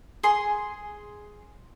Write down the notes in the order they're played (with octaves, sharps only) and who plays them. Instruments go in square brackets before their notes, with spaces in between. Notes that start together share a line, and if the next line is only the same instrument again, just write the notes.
[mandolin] G#4 C6